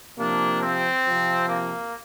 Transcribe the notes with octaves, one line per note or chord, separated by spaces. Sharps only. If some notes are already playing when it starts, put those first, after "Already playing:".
C3 F3 A#3 D4
C4
C3 F3
A#3